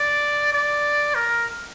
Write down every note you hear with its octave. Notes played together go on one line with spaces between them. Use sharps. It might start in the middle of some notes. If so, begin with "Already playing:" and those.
Already playing: D5
D5
A#4